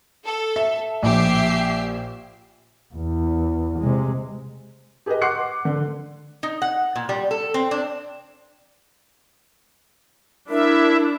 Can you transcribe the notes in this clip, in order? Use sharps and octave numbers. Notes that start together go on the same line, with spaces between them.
A4
E5
A#1 G4 E5 C7
E2
C3 G#3
G4 G#4 A#4 B4 D#5
F#5 C6 D6 F#6 C7 C#7
D3
D#4
F#5
A#2
G3
A4
C4
D4
D4 E4 A#4 E5